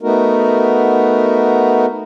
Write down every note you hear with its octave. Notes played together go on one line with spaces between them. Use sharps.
A3 B3 D#4 F#4 A#4